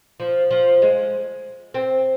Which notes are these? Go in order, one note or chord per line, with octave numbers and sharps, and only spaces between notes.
F3
F3
G#3
C4